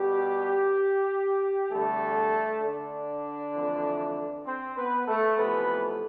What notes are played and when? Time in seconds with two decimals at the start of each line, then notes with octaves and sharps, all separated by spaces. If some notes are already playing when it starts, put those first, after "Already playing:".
Already playing: B2 G3 G4
1.70 E2 D3 G3 A3 A4
2.62 D3 D4
3.54 F2 E3 A3
4.46 C4
4.77 B3 B4
5.07 A3 A4
5.37 F2 C3 E3 A3 B3 B4